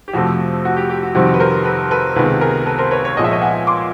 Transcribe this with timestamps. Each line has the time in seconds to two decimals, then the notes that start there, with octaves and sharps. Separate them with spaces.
0.08 G4
0.14 F2 C3 F3 A3 F#4
0.65 F#4
0.77 G4
0.89 G4
1.03 F#4
1.15 F2 C3 D#3 G3 C4 F#4
1.34 B4
1.40 A#4 C5
1.65 A4 B4
1.91 A4 B4
2.16 C#2 C3 D#3 G#3 B3 A4 B4
2.41 G#4 A#4
2.66 A4 B4
2.79 A#4 C5
2.91 B4 C#5
3.05 B4 C#5
3.17 A#2 F3 G#3 B3 D#5
3.24 E5
3.31 C#5 D#5
3.42 F#5 G#5
3.67 C6 D6